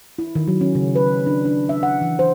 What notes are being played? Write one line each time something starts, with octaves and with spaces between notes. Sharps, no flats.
E4
D#3
F#3
C#4
C#3
B4
D4
D4
E5
F#5
E3
C5